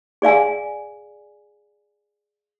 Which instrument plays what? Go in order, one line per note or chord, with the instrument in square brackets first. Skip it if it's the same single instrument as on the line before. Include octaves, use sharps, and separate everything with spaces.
[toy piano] G#4 D5 F5 G#5